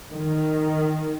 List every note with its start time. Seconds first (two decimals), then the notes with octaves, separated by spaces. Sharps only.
0.11 D#3